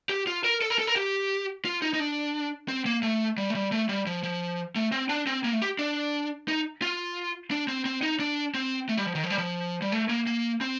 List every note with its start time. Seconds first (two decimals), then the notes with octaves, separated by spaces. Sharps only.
0.09 G4
0.27 F4
0.44 A#4
0.62 A4
0.70 A#4
0.79 A4
0.87 A#4
0.96 G4
1.65 F4
1.82 D#4
1.94 D#4
2.00 D4
2.68 C4
2.86 A#3
3.03 A3
3.38 G3
3.50 A3
3.55 G3
3.72 A3
3.89 G3
4.06 F3
4.23 F3
4.76 A3
4.92 C4
5.09 D4
5.27 C4
5.44 A#3
5.53 A3
5.62 G4
5.79 D4
6.48 D#4
6.82 F4
7.51 D4
7.68 C4
7.85 C4
8.03 D#4
8.20 D4
8.54 C4
8.89 A3
8.97 G3
9.06 F3
9.15 D#3
9.24 F3
9.30 G3
9.38 F3
9.82 G3
9.92 A3
10.09 A#3
10.27 A#3
10.61 C4